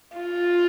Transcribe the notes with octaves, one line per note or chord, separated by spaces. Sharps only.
F4